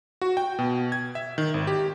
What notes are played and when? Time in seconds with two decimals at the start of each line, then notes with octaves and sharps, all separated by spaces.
0.21 F#4
0.37 G5
0.59 B2
0.92 G#6
1.15 E5
1.38 D#3
1.54 G#1
1.67 G4